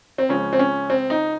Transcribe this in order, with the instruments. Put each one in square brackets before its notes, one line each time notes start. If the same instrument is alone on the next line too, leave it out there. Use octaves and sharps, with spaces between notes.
[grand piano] C4
C#2 C#3 F3 C#4
C4
C#4
C4
D#4